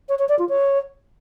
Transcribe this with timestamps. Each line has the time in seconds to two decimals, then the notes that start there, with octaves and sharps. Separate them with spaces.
0.09 C#5
0.19 C#5
0.29 D5
0.39 F4
0.49 C#5